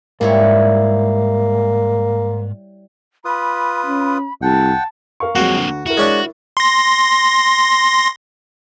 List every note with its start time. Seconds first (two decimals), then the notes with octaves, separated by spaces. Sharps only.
0.21 G#2 G3 A#3 E4 C#5
3.25 F4 B4 B5 D#6
3.86 C#4
4.42 C2 F#5 G5 A5
5.20 A#4 F5 C#6
5.35 F2 F#3 G#3 A#3 C4 F#4
5.55 D2
5.86 E4 F#4 A#4
5.97 G#3 C#4 D4
6.57 C6 A#6